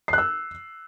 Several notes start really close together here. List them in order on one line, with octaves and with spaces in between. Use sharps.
C7 F#6 E6